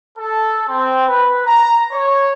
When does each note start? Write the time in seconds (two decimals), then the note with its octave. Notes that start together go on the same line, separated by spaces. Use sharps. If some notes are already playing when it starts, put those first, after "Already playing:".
0.19 A4
0.68 C4
1.08 B4
1.45 A#5
1.92 C#5